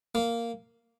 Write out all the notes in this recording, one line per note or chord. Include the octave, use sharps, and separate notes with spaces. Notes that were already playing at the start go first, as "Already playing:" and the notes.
A#3